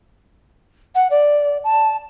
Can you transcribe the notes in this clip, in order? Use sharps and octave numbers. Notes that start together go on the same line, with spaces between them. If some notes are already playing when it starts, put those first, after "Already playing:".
F#5
D5
A5